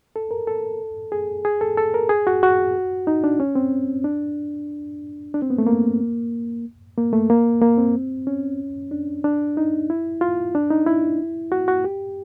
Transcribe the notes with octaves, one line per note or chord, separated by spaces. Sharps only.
A4
A#4
A4
G#4
G#4
A4
A4
A#4
G#4
F#4
F#4
D#4
D4
C#4
C4
D4
D4
C4
B3
A3
A#3
A#3
A3
A#3
A#3
C4
C#4
D4
D4
D#4
E4
F4
D4
D#4
E4
F#4
F#4
G4